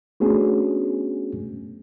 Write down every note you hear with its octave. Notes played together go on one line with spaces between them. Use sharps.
A3 B3 C#4 D4 F#4 G#4